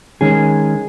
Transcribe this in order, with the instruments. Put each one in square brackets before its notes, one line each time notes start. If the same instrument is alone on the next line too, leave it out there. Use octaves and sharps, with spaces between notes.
[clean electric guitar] D#3 G#3 C#4 G#4